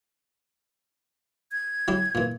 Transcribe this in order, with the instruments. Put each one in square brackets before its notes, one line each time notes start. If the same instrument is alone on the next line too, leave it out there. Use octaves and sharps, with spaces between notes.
[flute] G#6
[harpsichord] F#3 E4 G4
A#2 E3